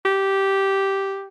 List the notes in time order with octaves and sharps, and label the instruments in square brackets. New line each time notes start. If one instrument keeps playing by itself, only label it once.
[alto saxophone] G4